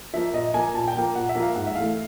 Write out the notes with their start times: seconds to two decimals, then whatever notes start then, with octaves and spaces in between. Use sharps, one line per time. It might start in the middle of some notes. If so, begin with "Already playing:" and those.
0.14 F3 A#3 E5
0.33 A#2 D#5
0.54 F3 A#3 G#5
0.74 A#2 A5
0.88 G5
0.95 F3 A#3
1.15 A#2 F#5
1.29 E5
1.35 F3 A#3
1.43 F5
1.56 G#2 F#5
1.67 E5
1.76 E3 A3 F5